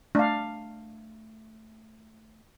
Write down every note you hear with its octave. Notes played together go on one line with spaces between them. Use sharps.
A3 D4 F5